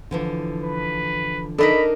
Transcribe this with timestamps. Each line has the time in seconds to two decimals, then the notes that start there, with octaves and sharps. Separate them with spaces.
0.11 D3 E3 F3
0.63 B4
1.58 D4 D#4 A4 A#4 D#5 B5